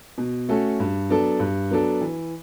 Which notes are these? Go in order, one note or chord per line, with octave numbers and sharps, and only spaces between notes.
B2
A3 C#4 F#4 A4
G2
F#3 B3 D4 A4
G2
F#3 B3 D4 A4
E3